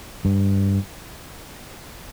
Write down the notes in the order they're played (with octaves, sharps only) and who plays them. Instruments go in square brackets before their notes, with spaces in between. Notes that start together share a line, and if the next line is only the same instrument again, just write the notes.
[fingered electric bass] G2